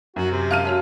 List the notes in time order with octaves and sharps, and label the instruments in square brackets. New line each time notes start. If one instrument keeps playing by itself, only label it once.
[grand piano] F#2 [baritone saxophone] F#4
[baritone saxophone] C3
[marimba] E5 A5 [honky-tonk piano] F5 F6 D#7
[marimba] F#4 C#5 A5